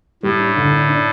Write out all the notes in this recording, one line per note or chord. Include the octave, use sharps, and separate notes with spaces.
A2 G3
D4
D3
D4
D4